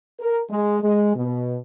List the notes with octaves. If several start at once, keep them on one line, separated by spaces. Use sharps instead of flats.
A#4
G#3
G#3
B2